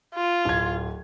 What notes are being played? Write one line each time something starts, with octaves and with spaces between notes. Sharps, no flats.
F4
D1 G#6